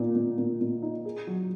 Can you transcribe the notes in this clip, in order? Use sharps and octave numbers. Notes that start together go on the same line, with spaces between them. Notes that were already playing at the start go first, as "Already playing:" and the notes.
Already playing: A#2 D#4
A#2
A#2
A#2
D#4
G#4
F#3